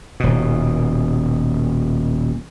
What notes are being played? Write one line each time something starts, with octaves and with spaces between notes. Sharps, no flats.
D#1 B2